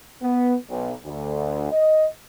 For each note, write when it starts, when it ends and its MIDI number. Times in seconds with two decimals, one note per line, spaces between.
0.22 0.55 59
0.70 0.92 35
1.05 1.67 38
1.72 2.06 75